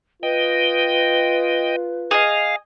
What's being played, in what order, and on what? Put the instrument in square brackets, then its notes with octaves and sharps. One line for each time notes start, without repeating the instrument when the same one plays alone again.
[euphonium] F4 [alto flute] B4 [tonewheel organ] D#5 G5
[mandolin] G#4 D#5 [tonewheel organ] F5